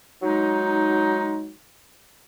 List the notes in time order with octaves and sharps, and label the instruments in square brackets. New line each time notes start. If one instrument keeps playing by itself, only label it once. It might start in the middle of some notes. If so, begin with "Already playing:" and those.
[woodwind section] F#3 G#3 D#4